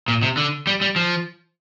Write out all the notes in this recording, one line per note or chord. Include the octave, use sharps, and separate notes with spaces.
A#2
C3
D3
G3
G3
F3